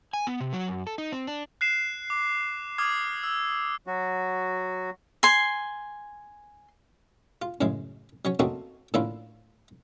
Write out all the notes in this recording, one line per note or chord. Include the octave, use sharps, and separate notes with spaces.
G#5
B3
C3
F#3
F#2
A4
D#4
C4
D4
F#6 C7 E7
D6
D6 D#6 F6 G#6
E6
F#3 F#4
G#5 C6
F4
F#2 A2 C#3 G#3
F#3 C#4 C#5
A3 A#3 C4 C#4 D#4 F#4
A2 D3 A#3 C#4 E4 F4